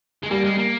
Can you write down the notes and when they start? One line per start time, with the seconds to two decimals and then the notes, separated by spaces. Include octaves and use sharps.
0.23 G#3
0.30 G3 A#3
0.44 G#3
0.58 A#3